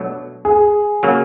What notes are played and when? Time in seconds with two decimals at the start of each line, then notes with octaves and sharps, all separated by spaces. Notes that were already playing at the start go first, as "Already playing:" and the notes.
Already playing: B2 F#3 A3 D4
0.45 G#4
1.03 C#3 F#3 A#3